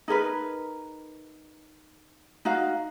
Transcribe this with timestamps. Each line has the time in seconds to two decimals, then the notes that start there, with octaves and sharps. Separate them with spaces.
0.08 D#4 G#4 A#4 B4
2.45 D#4 F#4 F5